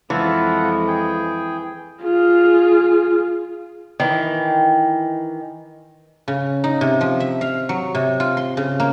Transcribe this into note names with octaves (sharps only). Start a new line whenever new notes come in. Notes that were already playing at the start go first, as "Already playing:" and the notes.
F2 E3 G#3 F4 A4 F#5
G#4 G5
F4 G#4
D#3 E3
C#3
D#4
C3
F3
E5
F5
F#3
C3
F4
C6
C#3
A#3